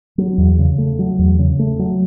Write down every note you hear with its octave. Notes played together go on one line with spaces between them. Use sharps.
F#3
E2
C#3
A3
F#3
E2
C#3
A3
F#3